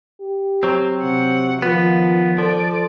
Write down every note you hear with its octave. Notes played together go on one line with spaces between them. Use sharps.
G4
F#3 C4
C3 F#5
D#3 F3 B3 F4
F3 A4 D5